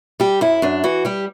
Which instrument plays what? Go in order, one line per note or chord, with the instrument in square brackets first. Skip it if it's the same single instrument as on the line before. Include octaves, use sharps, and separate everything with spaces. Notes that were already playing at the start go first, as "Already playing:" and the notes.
[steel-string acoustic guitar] G3 G4
F#2 E4
F#2 D4
E3 F#4
G3 G4